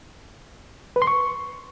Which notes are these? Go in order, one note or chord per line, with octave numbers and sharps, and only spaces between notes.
B4
C6
C#6